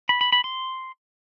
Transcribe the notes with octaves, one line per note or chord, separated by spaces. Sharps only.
B5
B5
B5
C6